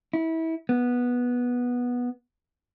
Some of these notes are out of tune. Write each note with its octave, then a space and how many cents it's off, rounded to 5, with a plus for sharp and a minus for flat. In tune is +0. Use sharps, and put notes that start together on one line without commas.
E4 -25
B3 -10